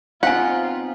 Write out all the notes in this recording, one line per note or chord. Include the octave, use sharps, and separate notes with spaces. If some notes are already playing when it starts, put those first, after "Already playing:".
B3 C4 D#4 F4 F5 F#5 G#5